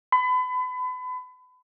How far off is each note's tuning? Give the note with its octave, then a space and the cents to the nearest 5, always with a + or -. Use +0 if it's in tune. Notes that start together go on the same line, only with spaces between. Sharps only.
B5 +35